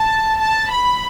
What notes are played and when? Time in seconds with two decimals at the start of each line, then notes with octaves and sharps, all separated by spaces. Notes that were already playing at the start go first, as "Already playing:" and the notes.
Already playing: A5
0.39 A5
0.70 B5